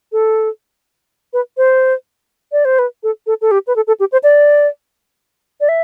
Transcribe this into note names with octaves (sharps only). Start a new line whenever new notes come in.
A4
B4
C5
D5
C5
B4
A4
A4
A4
G4
B4
A4
A4
G4
C5
D5
D5
E5